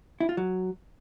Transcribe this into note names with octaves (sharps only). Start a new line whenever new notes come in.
E4
F4
F#3